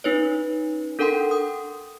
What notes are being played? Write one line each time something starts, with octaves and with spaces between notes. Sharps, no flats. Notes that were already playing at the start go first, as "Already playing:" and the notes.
C#4 D#4 B4 C#5
D4 A4 A#4 F#5 G5 C6
G5 D#6